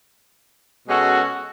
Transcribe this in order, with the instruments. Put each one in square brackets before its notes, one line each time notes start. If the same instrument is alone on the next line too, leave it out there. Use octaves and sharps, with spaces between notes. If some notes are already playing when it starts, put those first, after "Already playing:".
[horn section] B2 G#3 C#4 F#4 A4